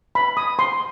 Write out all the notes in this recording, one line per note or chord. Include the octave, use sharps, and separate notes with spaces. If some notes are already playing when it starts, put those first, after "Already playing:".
B5
D#6
C6